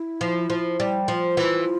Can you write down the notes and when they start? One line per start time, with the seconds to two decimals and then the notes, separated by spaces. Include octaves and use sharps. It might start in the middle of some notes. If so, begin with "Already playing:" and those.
Already playing: E4
0.21 F3
0.50 F3
0.80 G3
1.08 F3 F4
1.37 E3